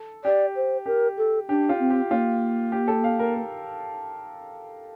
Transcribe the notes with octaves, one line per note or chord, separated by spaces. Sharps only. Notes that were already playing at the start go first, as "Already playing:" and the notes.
Already playing: A4
G4 D5
C5
G4 A#4
A4
D4 G4
F4
C4
G4
A#3 F4
G4
A4
F5
A#4
A#4